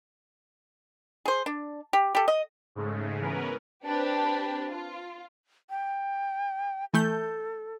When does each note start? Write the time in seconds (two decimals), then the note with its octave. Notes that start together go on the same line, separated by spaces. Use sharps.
1.25 G#4 C5
1.46 D4
1.93 G4
2.15 G4 A4
2.28 D#5
2.75 G#2 C#3 G#3 A3
3.20 E3 B3 C#4 A#4 B4
3.85 C4 D4 G4 B4
4.68 F4
5.70 G5
6.94 E3 A3 A4 G6